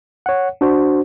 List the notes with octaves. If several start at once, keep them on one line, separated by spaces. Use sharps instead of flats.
C#5 F#5
D4 F#4 C5